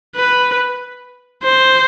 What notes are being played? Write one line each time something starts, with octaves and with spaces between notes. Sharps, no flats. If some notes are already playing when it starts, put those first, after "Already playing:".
B4
C5